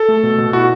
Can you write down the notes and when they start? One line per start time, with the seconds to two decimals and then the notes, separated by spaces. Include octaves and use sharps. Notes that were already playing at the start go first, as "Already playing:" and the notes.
Already playing: A4
0.08 A3
0.23 B2
0.38 B2
0.53 E4 F#4